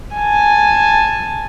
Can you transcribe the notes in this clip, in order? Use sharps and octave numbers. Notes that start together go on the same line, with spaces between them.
G#5 A5